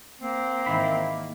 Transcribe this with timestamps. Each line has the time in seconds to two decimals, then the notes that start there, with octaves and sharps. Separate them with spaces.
0.21 A#3 C4
0.66 G#2 D#3 E3 B5 B6